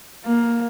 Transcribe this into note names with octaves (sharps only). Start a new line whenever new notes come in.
A#3